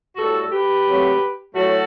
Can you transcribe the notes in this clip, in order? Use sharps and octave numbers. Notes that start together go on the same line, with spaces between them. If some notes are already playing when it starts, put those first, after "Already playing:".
A2 G3 F#4 A4
G4 B4
C3 F#3 A3
A2 F#3 A3 F#4 A4